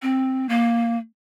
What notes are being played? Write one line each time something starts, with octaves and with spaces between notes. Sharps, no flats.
C4
A#3